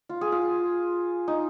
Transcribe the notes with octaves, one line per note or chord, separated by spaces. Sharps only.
F4
G#4
F4
D#4